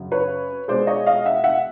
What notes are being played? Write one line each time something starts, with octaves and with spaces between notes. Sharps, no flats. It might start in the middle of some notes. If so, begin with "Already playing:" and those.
Already playing: F#2 C#3 F#3
B4 C#5
B2 G#3 C5 D5
C#5 D#5
D#5 F5
E5 F#5
E5 F#5